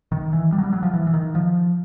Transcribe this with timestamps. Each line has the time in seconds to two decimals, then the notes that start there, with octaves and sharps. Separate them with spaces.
0.12 D#3
0.33 E3
0.52 G3
0.58 F#3
0.63 G3
0.73 F#3
0.83 F3
0.93 E3
1.07 E3
1.13 D#3
1.35 F3